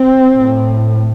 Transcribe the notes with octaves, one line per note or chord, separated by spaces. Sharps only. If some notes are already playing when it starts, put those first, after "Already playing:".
Already playing: C4
A2